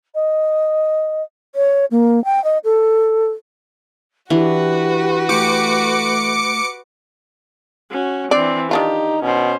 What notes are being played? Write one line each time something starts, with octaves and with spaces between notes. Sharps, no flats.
D#5
C#5
A#3
G5
D#5
A4
E3 D4 F#4 G4 B4
A3 G4 D6 C#7
C#4 F#4
E3 C4 D4 D5
D#3 D4 D#4 F4 G4
B2 C#4 C5